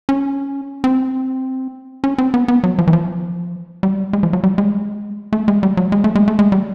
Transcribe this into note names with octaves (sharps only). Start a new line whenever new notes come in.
C#4
C4
C#4
C4
B3
B3
F#3
F3
E3
F3
G3
G#3
F3
F#3
G3
G#3
A3
G#3
G3
F#3
G#3
A3
G#3
A3
G#3
G3